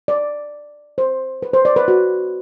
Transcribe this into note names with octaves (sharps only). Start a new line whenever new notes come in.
D5
C5
B4
C5
D5
B4
F#4